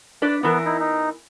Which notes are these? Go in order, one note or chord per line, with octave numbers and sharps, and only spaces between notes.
D4 B4 D5
E2 E3 B3 A#4
D#4 E4
D#4